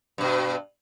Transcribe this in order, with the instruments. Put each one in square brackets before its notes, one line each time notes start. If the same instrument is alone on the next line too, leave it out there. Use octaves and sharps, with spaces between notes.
[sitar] G2 B2